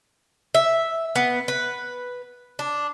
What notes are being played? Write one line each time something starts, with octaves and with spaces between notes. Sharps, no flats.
E5
B3
B4
D4